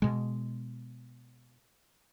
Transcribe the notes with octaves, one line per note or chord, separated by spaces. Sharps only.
B2 G#3